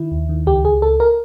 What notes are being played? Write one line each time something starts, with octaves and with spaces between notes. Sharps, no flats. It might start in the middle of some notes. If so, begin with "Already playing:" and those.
Already playing: D#3 E4
D#2
D#3
C#2 G4
C#2 G#4
C#2 A4
A#4